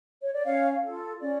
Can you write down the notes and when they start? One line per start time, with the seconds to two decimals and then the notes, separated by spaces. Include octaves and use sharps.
0.21 C#5
0.33 D5
0.45 C#4 C#5 F5
0.83 F4 A4
1.20 C#4 D5